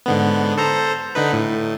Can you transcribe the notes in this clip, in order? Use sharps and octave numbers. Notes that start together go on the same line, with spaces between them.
G#2 D3 B3
A4 C5 A#5
D3 D#4 B4
A2